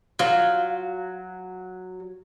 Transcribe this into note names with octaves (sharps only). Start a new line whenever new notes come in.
F#3 F4